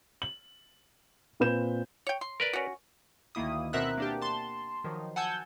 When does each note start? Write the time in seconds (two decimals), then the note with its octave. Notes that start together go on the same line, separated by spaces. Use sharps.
0.22 F#7
1.40 A#2 C4 B4 G6 E7
2.07 C#5 G5
2.21 C6
2.40 A#4 B4 D5
2.53 C#4 F#4
3.35 D2 D#3 A#3 E4 D#6
3.73 B2 C4 A#4 E5 F#5 F#6
3.98 A#3 D4 G4
4.22 A5 C6
4.84 D#3 F3 F#3
5.16 F#5 G#5 A5 E6 G6 G#6